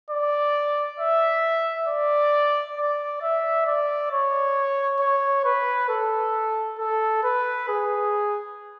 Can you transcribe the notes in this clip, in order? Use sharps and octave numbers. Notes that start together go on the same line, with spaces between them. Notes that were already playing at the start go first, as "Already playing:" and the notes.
D5
E5
D5
D5
E5
D5
C#5
C#5
B4
A4
A4
B4
G#4